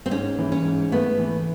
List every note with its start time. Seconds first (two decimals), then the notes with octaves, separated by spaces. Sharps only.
0.06 C4
0.11 G#2 C#4
0.38 E3
0.52 C#4
0.65 G#2
0.92 A3 B3
1.19 E3